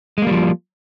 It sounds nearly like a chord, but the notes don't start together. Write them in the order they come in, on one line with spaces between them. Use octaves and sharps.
G#3 A#3 G3 F3